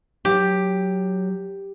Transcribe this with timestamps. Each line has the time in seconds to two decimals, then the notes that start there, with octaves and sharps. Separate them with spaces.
0.25 F#3 G4